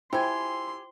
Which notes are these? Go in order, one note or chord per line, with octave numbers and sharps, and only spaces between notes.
E4 F4 G4 C5 G5 G#5 C6